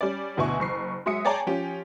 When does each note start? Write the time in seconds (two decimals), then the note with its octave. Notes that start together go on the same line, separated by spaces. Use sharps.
0.01 G3 C#4 D5
0.37 D2 B2 E4 G#5 C#6
0.60 F#1 C#6 C7
1.06 F#3 G#3 F#4 E5 D#6 C#7
1.25 G#4 C#5 D5 G5 A5 A#5
1.47 F3 C#4 G4